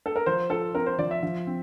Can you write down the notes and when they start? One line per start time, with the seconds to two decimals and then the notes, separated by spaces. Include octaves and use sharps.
0.06 A4
0.16 A#4
0.26 F3 C5
0.50 F4 A4
0.75 C4 A#4
0.86 C5
0.98 F3 D5
1.11 E5
1.23 F3
1.47 C4